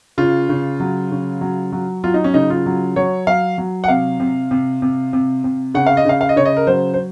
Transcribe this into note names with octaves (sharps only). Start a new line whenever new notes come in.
C#3 F4
C#3
F#3
C#3
F#3
F#3
F#3 F4
D#4
C#4
C#3 D#4
F4
F#3
F#3 C#5
F#3 F5
F#3
F#5
C3 F5
C3
C3
C3
C3
C3
C#3 F#5
F5
D#5
C#3 F5
F5
D#5
C#3 C#5
D#5
A#4
F#3 C5
C5